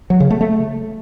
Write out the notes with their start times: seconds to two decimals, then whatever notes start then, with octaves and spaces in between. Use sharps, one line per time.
0.10 F#3
0.20 C#3
0.30 A3
0.41 A3